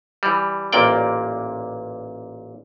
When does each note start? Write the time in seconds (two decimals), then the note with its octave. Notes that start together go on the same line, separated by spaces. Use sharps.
0.23 E3 G3
0.73 A1 A#2 A#3 D5 G5